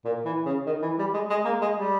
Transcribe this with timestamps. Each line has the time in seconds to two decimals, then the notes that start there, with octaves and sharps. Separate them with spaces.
0.05 A#2
0.25 E3
0.45 C#3
0.66 D#3
0.82 E3
0.99 G3
1.14 G#3
1.30 G#3
1.45 A#3
1.61 G#3
1.77 G3